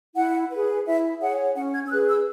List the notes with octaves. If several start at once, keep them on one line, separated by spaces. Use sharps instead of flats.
E4 F#5
G#4 B4
E4 E5
G#4 C#5 F#5
C#4 F#5
G#6
E6
G#4 B4 F#6
E6